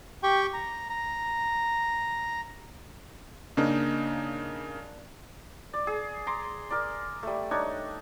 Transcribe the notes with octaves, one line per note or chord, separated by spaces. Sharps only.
G4 G5 C#6
A#5
A#5
C#3 A#3 D4 D#4
D5
G#4
A#5 C6 D6
A#4 D5
G3 A3
D4 D#4 C#5